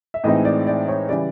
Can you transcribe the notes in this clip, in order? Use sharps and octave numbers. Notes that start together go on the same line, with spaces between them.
E5
A2 E3 G#3 C4 D#4 D#5
D5
D5
C#5
C#3 E3 G3 D5